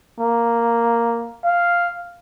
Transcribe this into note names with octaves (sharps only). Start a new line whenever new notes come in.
A#3
F5